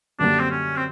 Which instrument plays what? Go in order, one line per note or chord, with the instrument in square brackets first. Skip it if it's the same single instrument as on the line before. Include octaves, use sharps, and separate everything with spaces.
[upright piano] F#2 D3 G3 A#3 [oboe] D4
[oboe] C4
C#4
C4